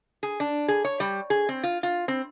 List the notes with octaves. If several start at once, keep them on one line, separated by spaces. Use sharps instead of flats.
G#4
D4
G#4
C#5
G3
G#4
C4
F4
F4
C4